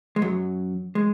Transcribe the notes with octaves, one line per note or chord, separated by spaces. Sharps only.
G#3
F#2 F#3
G#3